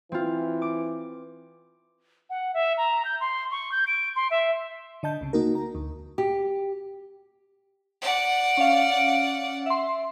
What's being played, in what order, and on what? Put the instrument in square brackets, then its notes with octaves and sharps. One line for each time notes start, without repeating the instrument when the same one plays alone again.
[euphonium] E3 [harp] C4 F4
[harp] D6
[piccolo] F#5
E5
A#5
G6
C6
C#6
G6
D7
C6
E5
[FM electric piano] D3 D#5 A5 G6
C2 C#3
A#3 D#4 F#4 A#4
A#5
D2
[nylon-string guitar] G4
[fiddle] D5 F#5
[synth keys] C#4 F5
E5 C6